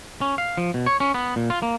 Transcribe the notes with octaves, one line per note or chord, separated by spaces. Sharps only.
C#4
F5
F3
B2
C#5
C#4
B3
A#2
F4
A#3